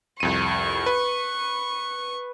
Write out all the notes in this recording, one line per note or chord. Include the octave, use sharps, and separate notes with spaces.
C2 F2 C#6 D#7
B4